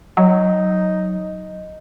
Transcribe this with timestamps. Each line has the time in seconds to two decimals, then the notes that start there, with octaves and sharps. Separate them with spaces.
0.17 F#3 D#4